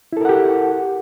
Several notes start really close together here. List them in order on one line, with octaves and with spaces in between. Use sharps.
E4 A4 A#4 F#5 G4